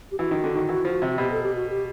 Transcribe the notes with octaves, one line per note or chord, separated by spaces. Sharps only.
G4
E3 F#4
D#3
D3
D#3
E3
F3
C3
B2 G4
A4
G4
F#4
G4